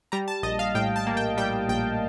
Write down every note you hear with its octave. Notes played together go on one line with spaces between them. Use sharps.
G3 A#5
A5
A#1 D#5
F5
A2 G5
A5
A#3
G5
G3 G5
A#1 G5